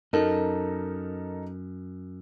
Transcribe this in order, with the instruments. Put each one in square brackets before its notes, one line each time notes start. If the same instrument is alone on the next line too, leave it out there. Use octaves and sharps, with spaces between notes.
[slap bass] F#2 [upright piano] D#4 A4 A#4